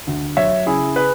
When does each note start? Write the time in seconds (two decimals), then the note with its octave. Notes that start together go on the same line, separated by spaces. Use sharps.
0.07 D2
0.37 F#3 C#5 E5
0.66 C#3 E4 G#4
0.96 G#4 B4